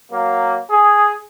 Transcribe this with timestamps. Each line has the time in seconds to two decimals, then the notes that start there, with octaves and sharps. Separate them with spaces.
0.12 F#3 A#3
0.71 G#4